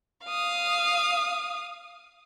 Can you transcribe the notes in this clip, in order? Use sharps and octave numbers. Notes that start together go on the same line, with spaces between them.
F5 D#6